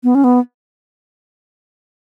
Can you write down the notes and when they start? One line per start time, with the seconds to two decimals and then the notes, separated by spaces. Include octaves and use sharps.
0.04 B3
0.15 C#4
0.24 B3